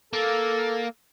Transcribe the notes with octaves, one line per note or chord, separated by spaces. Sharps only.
A#3 A4